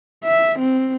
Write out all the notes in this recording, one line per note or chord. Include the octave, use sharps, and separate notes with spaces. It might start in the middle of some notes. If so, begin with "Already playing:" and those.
E5
C4